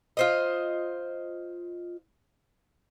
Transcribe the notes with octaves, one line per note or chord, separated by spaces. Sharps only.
F4 C5 D#5